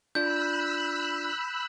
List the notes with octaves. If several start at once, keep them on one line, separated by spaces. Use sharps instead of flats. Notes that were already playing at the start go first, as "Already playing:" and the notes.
D4 F4 D5 B5 E6 F#6 G6